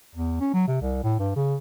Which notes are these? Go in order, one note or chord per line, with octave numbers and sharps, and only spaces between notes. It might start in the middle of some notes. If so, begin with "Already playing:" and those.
E2
C#4
F#3
C3
C2
A2
G2
C#3